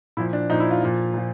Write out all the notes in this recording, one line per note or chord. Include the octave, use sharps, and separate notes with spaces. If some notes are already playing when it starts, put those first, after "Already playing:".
A#2 F3 E4
D4
A#2 F3 D#4
E4
F4
A#2 F3
A#2 F3